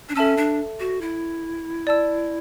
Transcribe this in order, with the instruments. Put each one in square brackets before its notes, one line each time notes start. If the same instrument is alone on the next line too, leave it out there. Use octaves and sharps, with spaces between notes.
[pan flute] D4
[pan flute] C#4 [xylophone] A4 E5 A5 E6
[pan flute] D4
F#4
E4
[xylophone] D5 A5 E6